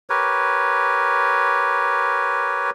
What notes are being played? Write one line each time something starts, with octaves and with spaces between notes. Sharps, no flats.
G4 A#4 B4 C#5